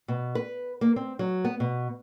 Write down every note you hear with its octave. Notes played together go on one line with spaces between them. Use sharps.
B2
B4
A#3
C4
F#3
B3
B2